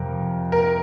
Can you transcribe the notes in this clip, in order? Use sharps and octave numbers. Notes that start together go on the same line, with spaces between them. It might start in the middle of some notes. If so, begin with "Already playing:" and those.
Already playing: F2 C3 F3 A#4
A#4